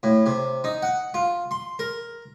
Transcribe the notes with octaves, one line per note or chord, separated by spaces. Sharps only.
A2
C3
D#4
F#5
F4
C6
A#4